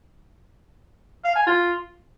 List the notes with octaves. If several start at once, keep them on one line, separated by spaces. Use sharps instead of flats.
F5
G#5
F4